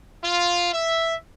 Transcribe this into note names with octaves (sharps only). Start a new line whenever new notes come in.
F4
E5